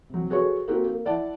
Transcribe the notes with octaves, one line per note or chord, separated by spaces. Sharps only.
C3 F#3
F#4 G#4 A4 B4 C#5 C#6
A#3 C4 D#4 F#4 G4 A4
A#3
E4 D5 F#5 A5